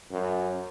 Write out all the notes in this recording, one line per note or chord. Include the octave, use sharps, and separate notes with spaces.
F#2